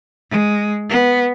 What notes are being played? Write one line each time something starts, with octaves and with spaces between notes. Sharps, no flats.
G#3
B3